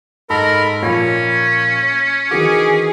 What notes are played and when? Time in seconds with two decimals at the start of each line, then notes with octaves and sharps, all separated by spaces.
0.30 G#2 A4 A#4 B5
0.82 A#2 F3 C#4 C#5
2.31 D#3 E3 F#4 G#4 D6